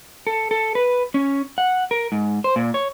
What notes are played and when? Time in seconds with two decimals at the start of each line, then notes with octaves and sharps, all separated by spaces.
0.27 A4
0.51 A4
0.75 B4
1.14 C#4
1.58 F#5
1.91 A#4
2.12 G#2
2.44 C5
2.56 A#2
2.74 C#5